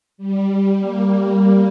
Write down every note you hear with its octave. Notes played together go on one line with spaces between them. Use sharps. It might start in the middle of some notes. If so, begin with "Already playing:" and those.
G3
A#3